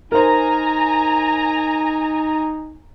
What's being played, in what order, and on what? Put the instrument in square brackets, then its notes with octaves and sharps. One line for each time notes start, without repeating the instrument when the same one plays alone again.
[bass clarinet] D#4 [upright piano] A#4 C5 [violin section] G#5 A#5